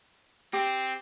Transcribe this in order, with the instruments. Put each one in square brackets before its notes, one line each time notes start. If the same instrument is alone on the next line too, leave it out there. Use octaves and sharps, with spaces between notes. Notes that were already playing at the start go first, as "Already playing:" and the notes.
[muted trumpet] C4 [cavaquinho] G4